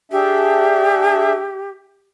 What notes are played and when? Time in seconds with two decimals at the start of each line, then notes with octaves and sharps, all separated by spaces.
0.12 D4 G4 G#4 E5